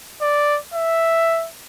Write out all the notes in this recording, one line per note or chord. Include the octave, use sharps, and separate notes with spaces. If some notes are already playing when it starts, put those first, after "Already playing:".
D5
E5